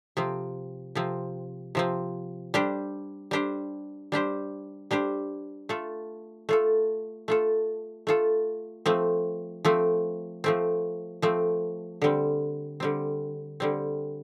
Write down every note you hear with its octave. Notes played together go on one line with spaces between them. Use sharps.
C3 F3 C4
C3 F3 C4
C3 F3 C4
G3 D4 G4 C5
G3 D4 G4 C5
G3 D4 G4 C5
G3 D4 G4 C5
A3 F4 A4
A3 F4 A4
A3 F4 A4
A3 F4 A4
F3 A3 C4
F3 A3 C4
F3 A3 C4
F3 A3 C4
D3 G3 C4
D3 G3 C4
D3 G3 C4